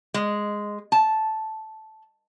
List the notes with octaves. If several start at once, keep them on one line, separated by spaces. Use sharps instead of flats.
G#3
A5